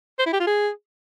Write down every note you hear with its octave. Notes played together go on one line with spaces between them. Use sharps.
C5
E4
G4
F4
G#4